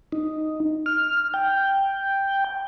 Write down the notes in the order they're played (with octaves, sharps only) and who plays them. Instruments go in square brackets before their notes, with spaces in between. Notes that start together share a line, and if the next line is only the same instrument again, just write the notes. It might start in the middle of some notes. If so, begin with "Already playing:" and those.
[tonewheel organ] D#4
F6
G5